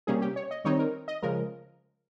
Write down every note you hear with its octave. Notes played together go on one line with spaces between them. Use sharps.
C3 G3 A#3 C#4 G#4
G4
C#5
D#5
D#3 G3 C4 D#4 C#5
A#4
D#5
C#3 F3 G#3 A#4